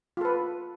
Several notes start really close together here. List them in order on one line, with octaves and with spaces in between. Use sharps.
F4 A4 B4